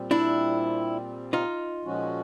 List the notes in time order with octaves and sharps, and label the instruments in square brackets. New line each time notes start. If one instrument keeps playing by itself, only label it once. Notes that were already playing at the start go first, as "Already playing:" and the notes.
Already playing: [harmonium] A#2 G3 C4
[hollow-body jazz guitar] D4 E4
D#4 F4
[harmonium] A#2 F3 G#3 C#4 F#4